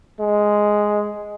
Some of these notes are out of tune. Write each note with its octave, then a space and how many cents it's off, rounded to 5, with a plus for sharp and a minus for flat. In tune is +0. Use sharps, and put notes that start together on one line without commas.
G#3 +0